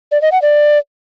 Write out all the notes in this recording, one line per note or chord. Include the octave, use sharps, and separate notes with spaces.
D5
D#5
F#5
D5